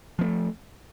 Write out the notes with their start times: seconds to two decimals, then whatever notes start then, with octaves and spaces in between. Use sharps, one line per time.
0.19 F3
0.21 B3
0.24 A3